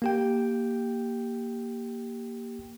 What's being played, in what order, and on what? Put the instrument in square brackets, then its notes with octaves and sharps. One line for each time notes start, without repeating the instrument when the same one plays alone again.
[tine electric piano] A#3 G4 G5